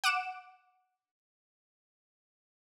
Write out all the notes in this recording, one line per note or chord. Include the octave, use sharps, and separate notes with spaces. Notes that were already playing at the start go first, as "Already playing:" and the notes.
F#5 D6 D7 E7